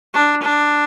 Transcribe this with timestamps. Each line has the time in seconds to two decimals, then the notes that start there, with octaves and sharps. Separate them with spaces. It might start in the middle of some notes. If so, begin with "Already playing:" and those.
0.14 D4
0.43 D4